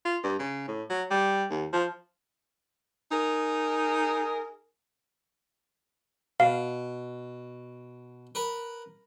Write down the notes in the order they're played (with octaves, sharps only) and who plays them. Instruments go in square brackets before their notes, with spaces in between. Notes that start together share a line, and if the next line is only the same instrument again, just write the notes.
[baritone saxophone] F4
G2
C#3
A2
F#3
G3
D#2
F3
[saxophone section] D#4 G#4 A#4
[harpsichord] B2 [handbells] F5
[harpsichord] A#4 B4